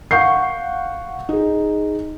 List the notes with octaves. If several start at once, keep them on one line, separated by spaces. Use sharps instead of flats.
F5 F#5 C#6 G6 C7
D#4 G#4